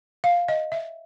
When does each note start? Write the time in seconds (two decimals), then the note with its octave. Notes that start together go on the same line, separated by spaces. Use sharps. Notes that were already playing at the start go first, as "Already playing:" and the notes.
0.24 F5
0.48 D#5
0.72 E5